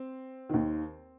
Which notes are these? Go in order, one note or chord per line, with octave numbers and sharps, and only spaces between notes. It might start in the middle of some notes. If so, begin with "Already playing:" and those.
Already playing: C4
D#2 D#3